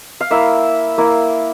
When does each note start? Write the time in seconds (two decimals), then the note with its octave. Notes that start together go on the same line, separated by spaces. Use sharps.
0.21 F5
0.31 A#3 E4 E5
0.98 A#3 E4